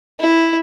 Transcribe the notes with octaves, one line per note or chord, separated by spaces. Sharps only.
E4